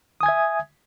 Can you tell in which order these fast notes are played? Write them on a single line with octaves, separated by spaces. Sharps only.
D#6 G#5 G#6 E5